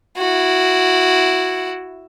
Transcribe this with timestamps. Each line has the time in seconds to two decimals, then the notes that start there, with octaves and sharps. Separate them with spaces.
0.18 E4 F#4